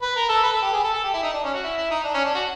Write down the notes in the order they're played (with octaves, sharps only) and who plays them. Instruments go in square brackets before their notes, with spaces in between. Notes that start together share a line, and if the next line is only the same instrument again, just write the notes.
[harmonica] B4
A#4
A4
B4
A4
G4
G#4
A4
A4
G4
E4
D#4
D4
C#4
F#4
E4
E4
D#4
D4
C#4
D4
F#4